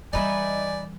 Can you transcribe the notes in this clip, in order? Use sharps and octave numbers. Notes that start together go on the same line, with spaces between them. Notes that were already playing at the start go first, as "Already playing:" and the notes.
E3 G3 D#4 B4 D5 E5 G#5